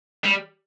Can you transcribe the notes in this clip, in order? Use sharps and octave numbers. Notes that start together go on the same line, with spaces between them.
G3